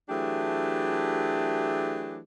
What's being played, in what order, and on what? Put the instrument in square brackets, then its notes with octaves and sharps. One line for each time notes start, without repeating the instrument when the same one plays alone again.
[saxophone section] E3 F#3 A3 D4 G4 G#4